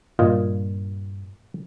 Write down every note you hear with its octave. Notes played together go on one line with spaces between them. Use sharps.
G2 A#2 G3 F4 D#5